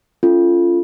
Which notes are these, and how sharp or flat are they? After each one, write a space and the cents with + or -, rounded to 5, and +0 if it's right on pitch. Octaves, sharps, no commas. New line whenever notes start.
C#4 +5 F4 -20 A4 +0